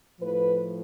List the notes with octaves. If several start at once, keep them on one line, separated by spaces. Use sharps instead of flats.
A2 F3 B4